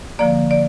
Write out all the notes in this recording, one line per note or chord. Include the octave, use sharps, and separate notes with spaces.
D3 F3 A#3 D5
D5